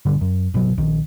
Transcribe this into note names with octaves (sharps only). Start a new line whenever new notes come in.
A#1 G2 D3
F#2
G1 B2 F#3
A#1 D#3